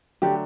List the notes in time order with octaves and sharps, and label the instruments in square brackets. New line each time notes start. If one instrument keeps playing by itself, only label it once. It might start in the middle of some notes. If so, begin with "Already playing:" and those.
[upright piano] D3 F#3 A3 D4 [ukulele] G4